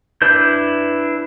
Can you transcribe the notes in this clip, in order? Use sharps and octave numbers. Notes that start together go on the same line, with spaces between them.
D4 E4 B4 G6